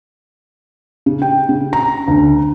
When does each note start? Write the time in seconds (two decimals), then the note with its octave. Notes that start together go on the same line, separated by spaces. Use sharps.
1.06 C#3
1.22 G5
1.49 C#3
1.73 A#5
2.08 D2